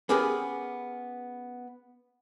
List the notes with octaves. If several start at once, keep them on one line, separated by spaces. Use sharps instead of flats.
B3 C#4 G4 G#4 A#4 B4